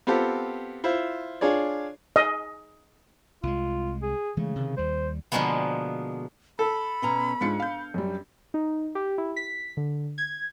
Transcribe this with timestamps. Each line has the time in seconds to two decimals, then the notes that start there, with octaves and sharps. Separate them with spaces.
0.07 B3 C4 F4 G4 A4
0.84 E4 F4 C5
1.41 D4 F4 G#4 C#5 D5
2.16 D#5
3.43 C2 G#3 F4
4.03 G#4
4.37 C#3 E3 G#3 A3
4.56 C3 D#3
4.77 D#2 G3 C5
5.32 B2 D3 F3 G#3 A#3 B3
6.59 A4 B5
7.02 B2 C#4 A#5
7.41 G#2 D4 F4 C#7
7.60 F5 G6
7.94 F#2 G3
8.54 D#4
8.95 G4
9.18 E4
9.36 B6
9.77 D3
10.18 G#6